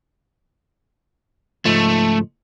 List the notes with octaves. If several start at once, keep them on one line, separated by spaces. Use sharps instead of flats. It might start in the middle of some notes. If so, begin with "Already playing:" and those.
C#2 G#2 F3 A3